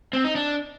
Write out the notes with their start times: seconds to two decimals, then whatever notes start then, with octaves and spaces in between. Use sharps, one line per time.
0.13 C4
0.24 D#4
0.35 D4